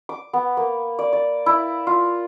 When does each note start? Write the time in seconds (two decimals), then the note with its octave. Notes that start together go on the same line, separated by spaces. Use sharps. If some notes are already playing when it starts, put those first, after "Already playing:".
0.09 D6
0.33 B3
0.57 A#3
0.99 D5
1.13 D5
1.46 E4
1.87 F4